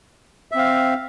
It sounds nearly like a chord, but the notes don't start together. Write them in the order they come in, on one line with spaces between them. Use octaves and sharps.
E5 C4 F5